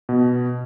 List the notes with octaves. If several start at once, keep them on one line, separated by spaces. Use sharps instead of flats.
B2